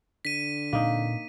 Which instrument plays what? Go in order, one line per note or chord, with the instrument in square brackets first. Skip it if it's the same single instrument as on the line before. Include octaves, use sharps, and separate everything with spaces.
[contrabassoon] D3 [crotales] B6 D#7
[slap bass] A#2 C4 [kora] A#3 D#4